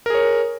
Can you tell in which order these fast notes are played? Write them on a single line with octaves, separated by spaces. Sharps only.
A#4 G#4 C#5